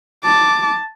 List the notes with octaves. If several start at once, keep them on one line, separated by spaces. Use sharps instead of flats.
A5 D6